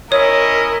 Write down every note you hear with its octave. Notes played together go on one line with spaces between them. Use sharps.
C#4 E4 A#4 C#5 D#5